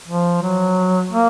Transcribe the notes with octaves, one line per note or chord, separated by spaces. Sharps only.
F3
F#3
A#3